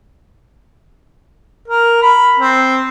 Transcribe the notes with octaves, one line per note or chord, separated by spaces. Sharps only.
A#4
B5
C4